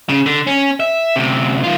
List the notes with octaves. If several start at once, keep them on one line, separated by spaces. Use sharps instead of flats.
C#3
D3
C#4
E5
D2 C3
D#3 F4